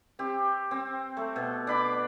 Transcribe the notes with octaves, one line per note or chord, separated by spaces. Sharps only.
C4 G4
C4
A3
B2
D4 B5 D6